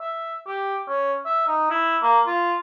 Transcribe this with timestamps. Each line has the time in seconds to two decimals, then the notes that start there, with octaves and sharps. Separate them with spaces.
0.01 E5
0.47 G4
0.88 C#4
1.26 E5
1.47 D#4
1.70 E4
2.02 A#3
2.27 F4